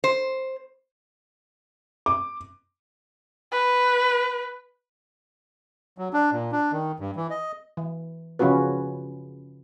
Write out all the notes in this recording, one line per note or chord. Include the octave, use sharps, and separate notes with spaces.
C5
D6
B4
F#3
D4
A#2
D4
D#3
G2
E3
D#5
E3
C#3 F3 C#4 F4 F#4 B4